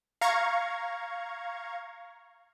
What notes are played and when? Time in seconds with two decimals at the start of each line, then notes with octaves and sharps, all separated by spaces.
0.21 F5 A#5 C#6 G#6